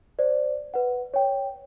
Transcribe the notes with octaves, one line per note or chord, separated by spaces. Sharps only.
C5 D5
B4 F#5
C#5 G5